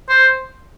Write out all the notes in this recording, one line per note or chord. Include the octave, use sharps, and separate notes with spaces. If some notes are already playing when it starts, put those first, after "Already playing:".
C5